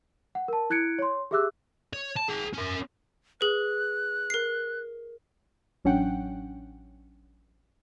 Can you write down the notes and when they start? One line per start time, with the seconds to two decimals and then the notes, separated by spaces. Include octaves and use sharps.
0.35 F#5
0.48 A#4 A5
0.70 E4 F#6 G#6 C#7 D7
0.99 C#5 C6
1.31 G4 G#4 E5 D6 E6 F#6
1.93 C#5
2.17 A5
2.29 G#4 G5
2.54 C#4 A#4
3.41 G#4 B4 F#6
4.30 A#4 C7
5.85 A1 F#3 C#4 D4 F#5 G5